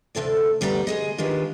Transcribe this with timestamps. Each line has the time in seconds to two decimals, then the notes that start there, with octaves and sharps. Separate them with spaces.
0.15 D2 G2 C3 A4 D5
0.61 D2 G3 B3 D5 A#5
0.87 G#3 G#4 D#5
1.18 D#3 G#3 D4 F4 G4 B4